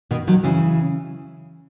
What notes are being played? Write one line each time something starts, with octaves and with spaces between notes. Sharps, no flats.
B2 D#3
D#3 F#3
C#3 E3